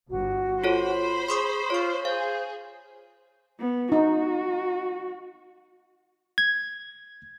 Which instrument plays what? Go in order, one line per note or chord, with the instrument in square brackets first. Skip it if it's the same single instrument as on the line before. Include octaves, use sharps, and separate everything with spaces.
[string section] G1 [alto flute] F#4
[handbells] F4 A4 C#5 [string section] C5 B5
[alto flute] G#4 [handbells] C6 C#6 D#6
[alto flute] F4 [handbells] C#5 C#6
[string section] G#4 [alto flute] C5 [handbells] F5
[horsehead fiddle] B3
[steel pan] D#4 [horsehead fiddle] F#4
[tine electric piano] G#6